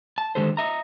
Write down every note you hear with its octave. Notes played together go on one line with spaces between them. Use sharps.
A5
D3 D#3 G#3 G4 A4 C5
D#5 E5 A#5